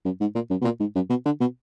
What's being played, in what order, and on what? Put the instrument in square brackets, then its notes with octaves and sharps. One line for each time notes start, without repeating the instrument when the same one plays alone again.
[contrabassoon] F#2
G#2
A#2
F#2
B2
A#2
G#2
F#2
B2
D3
B2